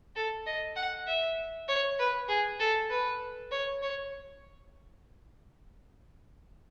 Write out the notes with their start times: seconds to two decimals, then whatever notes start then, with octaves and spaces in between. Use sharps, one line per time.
0.16 A4
0.46 D#5
0.76 F#5
1.07 E5
1.68 C#5
1.99 B4
2.28 G#4
2.59 A4
2.90 B4
3.51 C#5
3.82 C#5